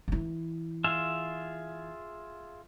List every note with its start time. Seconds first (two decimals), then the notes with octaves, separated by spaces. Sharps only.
0.08 E3 E4
0.84 F4 G#4 E5